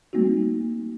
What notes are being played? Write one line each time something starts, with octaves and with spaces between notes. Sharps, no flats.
G3 A3 A#3 C4 D#4 F#4